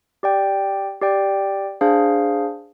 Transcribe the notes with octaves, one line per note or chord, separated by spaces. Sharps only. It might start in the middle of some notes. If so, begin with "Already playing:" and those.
G4 D5 G5
G4 D5 G5
D4 G#4 C5 F5